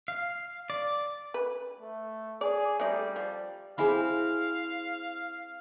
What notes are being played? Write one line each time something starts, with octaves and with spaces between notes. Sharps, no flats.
F5
D5
B4
A3
G#4 D5
G3 A3 D#4 D5
F3
C4 E4 G#4 F5 G#5 B5